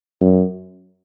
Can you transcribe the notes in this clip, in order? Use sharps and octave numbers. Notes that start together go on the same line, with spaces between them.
F#2